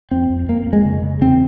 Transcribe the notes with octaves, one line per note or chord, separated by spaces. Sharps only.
F2 C4
F2
F2 A#3
F2
G#3
C#3
C#3
E2 C4